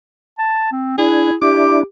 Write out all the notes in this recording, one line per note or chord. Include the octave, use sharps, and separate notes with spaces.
A5
C4
D4 E4 G#4
D4 E4 G4 D6